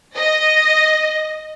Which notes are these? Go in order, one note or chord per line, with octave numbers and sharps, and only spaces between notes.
D#5